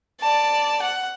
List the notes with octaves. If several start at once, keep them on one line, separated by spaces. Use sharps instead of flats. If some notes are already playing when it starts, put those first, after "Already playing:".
D5 A5
F#5